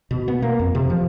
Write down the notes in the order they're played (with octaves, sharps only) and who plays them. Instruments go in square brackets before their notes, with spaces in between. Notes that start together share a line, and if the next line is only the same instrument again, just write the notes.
[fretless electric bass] B2
B3
A#3
F2
C3
F3